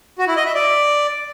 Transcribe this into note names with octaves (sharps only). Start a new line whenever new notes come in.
F#4
E4
D#5
E5
D5